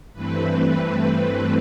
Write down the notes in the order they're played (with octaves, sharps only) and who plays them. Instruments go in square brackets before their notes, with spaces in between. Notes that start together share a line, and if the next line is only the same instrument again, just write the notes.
[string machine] G2 E3 A3 C4 B4